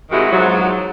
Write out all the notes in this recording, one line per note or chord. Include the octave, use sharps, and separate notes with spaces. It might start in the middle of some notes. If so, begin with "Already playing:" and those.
G#2 C3 D#3 G#3 E4 F#4
E2 G#2 F3 F#3